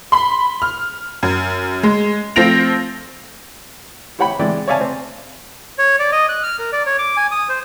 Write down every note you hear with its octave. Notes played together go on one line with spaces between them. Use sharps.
B5 C6
F6
F#2
G#3
F3 A3 C4 A#6 D7 F7
E4 G4 C#5 F#5 G5 B5
E3 G#3 D5 G5
C#5 D5 E5 F5 G#5 A5
C4
C#5
D5
D#5
F#6
F6
A#4
D5
C#5
D6
G#5
D#6
C5